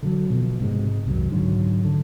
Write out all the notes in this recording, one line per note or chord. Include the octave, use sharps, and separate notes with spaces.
D3 F3 F#3
B2 F3
G#2 C3 G#3
C2 F#2 D#3 F#3
G#2 D3 F#3
D3